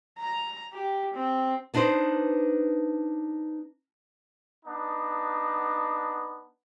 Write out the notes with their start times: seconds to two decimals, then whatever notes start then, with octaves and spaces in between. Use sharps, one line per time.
0.19 A#5
0.73 G4
1.14 C4
1.74 B3 D4 D#4 B4 C5
4.65 B3 D4 D#4